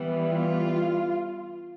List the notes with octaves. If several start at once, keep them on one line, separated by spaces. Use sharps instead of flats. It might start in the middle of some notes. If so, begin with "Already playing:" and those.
Already playing: E3 G3 B3
F4